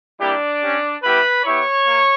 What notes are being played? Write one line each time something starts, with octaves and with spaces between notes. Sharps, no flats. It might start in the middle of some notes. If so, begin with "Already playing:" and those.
G3 A#3 D4 E4 G4 D5
C#4 G4
G3 B3 E4 G4 B4 B5
B3 E4 G4 C#5 C#6
A#3